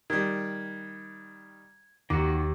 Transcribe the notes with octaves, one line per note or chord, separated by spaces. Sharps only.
D#3 G3 G#6
D#2 D#3 F#4 D6